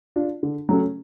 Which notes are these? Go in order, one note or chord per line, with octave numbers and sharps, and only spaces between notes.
D4 F4
D3
F#3 A3 C#4